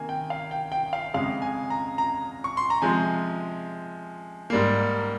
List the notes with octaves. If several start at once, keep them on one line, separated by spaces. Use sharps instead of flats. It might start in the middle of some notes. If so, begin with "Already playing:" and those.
Already playing: C3 D#3 A#3 G#5
G5
F5
G5
G5
F5
F2 C#3 G#3 F5
G#5
A#5
A#5
C#6
C6
A#5
C3 F3 G#3 G#5
G#2 G3 A#3